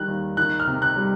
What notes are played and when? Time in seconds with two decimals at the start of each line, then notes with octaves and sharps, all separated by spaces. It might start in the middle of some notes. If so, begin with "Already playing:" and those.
Already playing: D#3 G3 F#6
0.08 D#2
0.37 D#3 F#6
0.60 F6
0.67 C3
0.82 F#6
0.96 G3